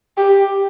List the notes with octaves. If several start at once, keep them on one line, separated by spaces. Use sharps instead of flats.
G4